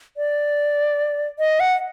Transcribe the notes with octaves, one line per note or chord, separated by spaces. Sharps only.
D5
D#5
F#5